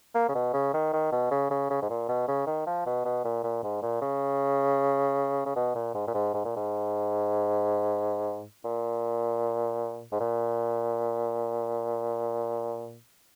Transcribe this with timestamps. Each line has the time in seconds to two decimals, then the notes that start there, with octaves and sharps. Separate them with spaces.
0.15 A#3
0.29 C#3
0.35 B2
0.54 C#3
0.74 D#3
0.93 D#3
1.12 B2
1.31 C#3
1.51 C#3
1.70 C#3
1.82 G#2
1.90 A#2
2.09 B2
2.28 C#3
2.47 D#3
2.66 F3
2.86 B2
3.05 B2
3.24 A#2
3.43 A#2
3.63 G#2
3.82 A#2
4.02 C#3
5.46 C#3
5.56 B2
5.75 A#2
5.94 G#2
6.07 A#2
6.14 G#2
6.34 G#2
6.45 A#2
6.56 G#2
8.64 A#2
10.12 G#2
10.20 A#2